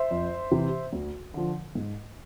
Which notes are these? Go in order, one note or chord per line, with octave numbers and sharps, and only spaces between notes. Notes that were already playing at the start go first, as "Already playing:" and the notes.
Already playing: C5 E5
F2
C3 E3
D2
D3 F3
G#2